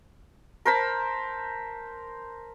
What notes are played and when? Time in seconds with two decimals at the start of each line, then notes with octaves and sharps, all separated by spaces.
0.65 A#4 C5 A5 B5